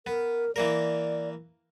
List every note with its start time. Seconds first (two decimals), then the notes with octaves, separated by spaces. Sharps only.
0.07 B3 A#4
0.56 E3 A#3 A#4 D5